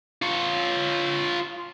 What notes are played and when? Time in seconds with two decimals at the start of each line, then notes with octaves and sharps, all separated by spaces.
0.22 F4 C#5